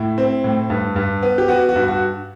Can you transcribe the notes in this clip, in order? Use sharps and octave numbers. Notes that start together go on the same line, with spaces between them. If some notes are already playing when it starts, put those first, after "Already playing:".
Already playing: A2 E4
C4
A2
G2
G2
B3
G4
B3 F#4
F#4
G2
F#4